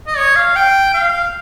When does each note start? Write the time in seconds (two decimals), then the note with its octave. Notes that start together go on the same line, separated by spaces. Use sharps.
0.07 D#5
0.17 C#5
0.36 F5
0.56 G5
0.94 F5